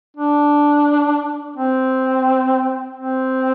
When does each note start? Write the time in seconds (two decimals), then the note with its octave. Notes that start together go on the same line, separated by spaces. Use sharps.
0.17 D4
1.56 C4
2.96 C4